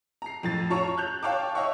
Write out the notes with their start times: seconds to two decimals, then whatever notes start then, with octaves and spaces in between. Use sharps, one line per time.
0.22 A#5 C7
0.43 F2 A2 F3 A6
0.70 F4 C#5 A5 A#5 C#6
0.98 F#6 G6 F7
1.23 C#5 F5 G5 A5 D6
1.55 C#5 D#5 E5 F#5 C#6